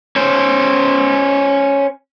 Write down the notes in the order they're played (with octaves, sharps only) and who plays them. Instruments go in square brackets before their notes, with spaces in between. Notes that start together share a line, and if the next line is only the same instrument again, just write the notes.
[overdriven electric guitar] C#4 C5